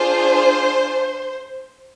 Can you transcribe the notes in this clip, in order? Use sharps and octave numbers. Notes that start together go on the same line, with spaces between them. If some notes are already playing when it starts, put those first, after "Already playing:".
Already playing: D4 F4 G#4 C5